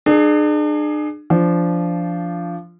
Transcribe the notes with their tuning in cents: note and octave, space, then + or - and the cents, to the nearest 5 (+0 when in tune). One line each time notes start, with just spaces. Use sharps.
D4 +40 G#4 +15
F3 -15 D4 -15